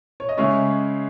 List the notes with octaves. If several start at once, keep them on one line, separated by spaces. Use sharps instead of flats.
C#5
D#5
C#3 G#3 C#4 C#5 E5